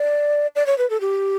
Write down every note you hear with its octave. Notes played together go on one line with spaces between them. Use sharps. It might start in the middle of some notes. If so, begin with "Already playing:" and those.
Already playing: D5
D5
C#5
B4
A4
G4